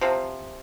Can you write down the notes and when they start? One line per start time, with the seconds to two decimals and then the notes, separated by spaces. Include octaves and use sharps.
0.01 C3 F3